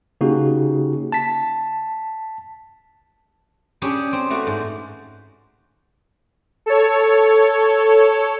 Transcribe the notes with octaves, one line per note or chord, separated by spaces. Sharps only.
C#3 A#3 D#4 F#4 G4
A5 B6
C#4 D4 G4 G#4 B5
C4
A3 F#4 B4 D5 F5
G#2
A4 C#5